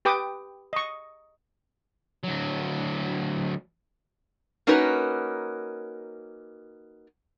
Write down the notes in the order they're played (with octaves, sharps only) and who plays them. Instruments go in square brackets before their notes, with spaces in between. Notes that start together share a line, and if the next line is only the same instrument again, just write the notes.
[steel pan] G4 B4 G5 D6 D#6
D#5 C#6
[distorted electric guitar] D2 F#3
[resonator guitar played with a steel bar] A#3 C#4 D#4 F#4 A#4 B4